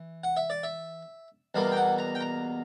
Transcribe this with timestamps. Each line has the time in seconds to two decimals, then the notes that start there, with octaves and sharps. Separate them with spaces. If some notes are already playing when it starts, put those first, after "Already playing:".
Already playing: E3
0.24 F#5
0.37 E5
0.50 D5
0.63 E5
1.55 E2 B2 G3 A#3
1.72 G5
1.77 F#5
1.99 A#5
2.15 G5
2.21 A#5